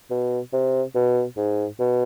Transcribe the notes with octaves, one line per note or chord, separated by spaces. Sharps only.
B2
C3
B2
G#2
B2